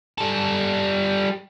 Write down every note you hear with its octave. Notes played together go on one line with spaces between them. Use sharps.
G3 A4